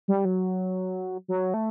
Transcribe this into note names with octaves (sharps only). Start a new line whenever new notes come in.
G3
F#3
F#3
A3